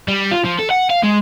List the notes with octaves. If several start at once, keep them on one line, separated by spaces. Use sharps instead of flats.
G3
F4
F3
A4
F#5
F5
G#3